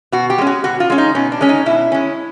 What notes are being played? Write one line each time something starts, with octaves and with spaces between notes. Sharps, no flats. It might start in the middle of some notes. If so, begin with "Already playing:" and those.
B2 F#4
G4
G#3 C#4
F#4
B2 F#4
F4
G#3 C#4
D#4
B2 C#4
D4
G#3 C#4
D#4
B2 E4
G#3 C#4